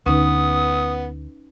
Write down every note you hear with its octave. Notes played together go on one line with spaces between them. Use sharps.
D2 D3 B3 C#4 D#4 B4 D#6